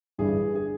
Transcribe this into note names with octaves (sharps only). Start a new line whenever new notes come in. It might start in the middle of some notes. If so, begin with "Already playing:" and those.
G1 G2 E3 G3 G#4
G#4